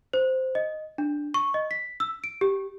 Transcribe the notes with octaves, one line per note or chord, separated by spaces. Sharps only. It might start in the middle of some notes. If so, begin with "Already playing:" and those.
C5
D#5
D4
C#6
D#5
B6
E6
D7
G4